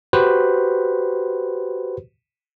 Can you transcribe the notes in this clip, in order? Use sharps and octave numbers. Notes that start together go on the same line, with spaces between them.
F#4 G4 B4 C5